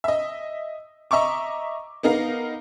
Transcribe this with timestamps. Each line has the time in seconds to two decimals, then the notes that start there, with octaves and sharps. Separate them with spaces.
0.04 D#5 E5
1.11 D#5 E5 A#5 C#6 D6
2.03 B3 D#4 A#4 F5